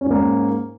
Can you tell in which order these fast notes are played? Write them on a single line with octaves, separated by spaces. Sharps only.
C#4 G#2 A#3